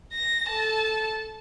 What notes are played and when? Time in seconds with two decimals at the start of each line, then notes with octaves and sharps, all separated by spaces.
0.13 A#6
0.48 A4 A5